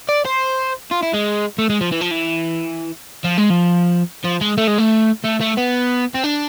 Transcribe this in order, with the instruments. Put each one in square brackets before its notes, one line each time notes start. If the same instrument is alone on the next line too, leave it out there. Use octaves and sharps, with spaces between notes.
[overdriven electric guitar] D5
C5
F4
E4
G#3
A3
G#3
F3
E3
F3
E3
F3
G#3
F3
F3
G#3
A3
G#3
A3
A3
A3
B3
C4
D4